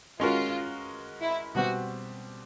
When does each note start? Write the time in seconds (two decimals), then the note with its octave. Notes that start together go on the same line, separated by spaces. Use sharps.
0.20 G#3 C#4 F4 F#4 A#4
1.21 E4
1.55 B2 G3 C4 F#4